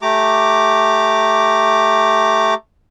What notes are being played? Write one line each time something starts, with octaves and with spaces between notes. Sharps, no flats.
A3 G4 A#5 D6